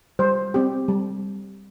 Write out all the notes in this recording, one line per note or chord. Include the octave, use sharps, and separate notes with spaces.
G3 C5
C4 G4
G3